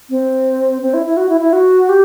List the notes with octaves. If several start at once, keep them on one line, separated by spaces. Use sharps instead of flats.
C4
C4
E4
E4
F#4
E4
E4
F#4
G4